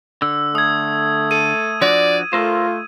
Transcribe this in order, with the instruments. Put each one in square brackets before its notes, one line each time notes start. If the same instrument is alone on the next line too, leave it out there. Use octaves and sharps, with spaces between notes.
[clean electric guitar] D3 [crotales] E6
[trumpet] A3 [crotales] D#6 G#6
[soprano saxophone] A4 [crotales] D#7
[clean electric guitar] F3 D4 F#4 [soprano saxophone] D5
[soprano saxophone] A3 [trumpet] F4 [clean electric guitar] A4 A#4 C5